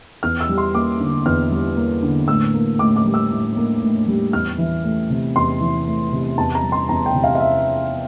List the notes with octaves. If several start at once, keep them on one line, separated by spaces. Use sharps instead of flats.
E2 F6
E6
G3
C6
A#3 D6
D3
E2 F6
G3
A#3
D3
A2 E6
A#3
A2 D6
D6
G3
E6
A2
A#3
A2
G3
E2 F6
E3
A3
C3
E2 C6
E3
A3
C3
E2 A5
A#5
G3
C6
E2 A#5
G5
C3
F5
F5
E5